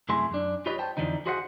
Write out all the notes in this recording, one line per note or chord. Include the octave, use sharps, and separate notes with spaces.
C2 F#2 A3 E4 G#4 C6
F#2 D4
F4 G4 B4 C#5 D#5
C5 G5 A5
F2 D3 E3 F3 D#4
F#4 G#4 C5 D#5 F5 F#5